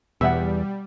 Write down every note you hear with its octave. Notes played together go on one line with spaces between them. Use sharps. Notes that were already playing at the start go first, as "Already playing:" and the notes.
E2 B2 G3 E5 F#5